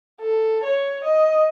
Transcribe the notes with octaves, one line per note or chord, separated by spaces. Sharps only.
A4
C#5
D#5